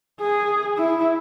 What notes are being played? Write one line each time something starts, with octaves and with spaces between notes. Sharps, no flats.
G#4
E4